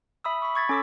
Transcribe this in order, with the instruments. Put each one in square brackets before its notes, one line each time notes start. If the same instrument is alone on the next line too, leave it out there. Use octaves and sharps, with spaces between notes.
[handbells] E5 B5 D#6 E6
B5 C#6
C#6 G#6 A6 B6
C#4 A4 D6 E6 B6